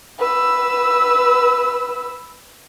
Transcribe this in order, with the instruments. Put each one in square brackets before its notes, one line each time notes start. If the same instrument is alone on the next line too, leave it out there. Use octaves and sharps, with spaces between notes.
[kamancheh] B4 E6